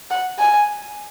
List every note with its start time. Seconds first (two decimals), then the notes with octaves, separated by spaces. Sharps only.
0.10 F#5
0.39 G#5